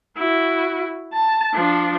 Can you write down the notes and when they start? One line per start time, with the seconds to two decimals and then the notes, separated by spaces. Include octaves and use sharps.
0.17 E4 F#4
1.13 A5
1.53 F3 D4